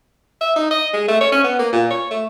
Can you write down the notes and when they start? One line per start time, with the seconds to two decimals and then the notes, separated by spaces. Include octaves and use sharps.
0.41 E5
0.56 D#4
0.71 D#5
0.93 G#3
1.08 A3
1.21 C#5
1.32 C#4
1.44 B3
1.59 A#3
1.73 A#2
1.91 C#5
2.11 A3